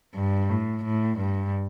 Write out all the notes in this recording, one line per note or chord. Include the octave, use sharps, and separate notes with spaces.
G2
A2
A2
G2